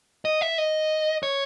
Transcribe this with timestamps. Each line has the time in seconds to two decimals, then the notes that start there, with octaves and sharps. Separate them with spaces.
0.25 D#5
0.41 E5
0.58 D#5
1.23 C#5